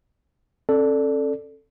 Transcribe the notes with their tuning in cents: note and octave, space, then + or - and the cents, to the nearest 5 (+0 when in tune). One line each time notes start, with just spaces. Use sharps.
C#4 -45 A4 +0 D5 +0